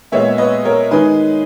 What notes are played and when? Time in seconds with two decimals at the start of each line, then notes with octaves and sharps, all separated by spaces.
0.12 A#2 G#3 B3 C#5 E5
0.38 B4 D#5
0.65 A#4 C#5
0.91 D#3 G#3 D#4 G#4 B4